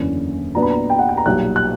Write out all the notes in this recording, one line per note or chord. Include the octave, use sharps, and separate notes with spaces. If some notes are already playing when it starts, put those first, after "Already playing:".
Already playing: F#1 E2 D3 A#3 C#4
A#2 F#3 B3 D4 A#5
B5
A#5
G5
F#5
G5
A#5
B1 A#2 G3 F#6
F#6